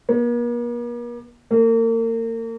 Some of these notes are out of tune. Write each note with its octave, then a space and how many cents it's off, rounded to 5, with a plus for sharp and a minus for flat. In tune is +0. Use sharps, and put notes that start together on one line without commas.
A#3 +45
A#3 -35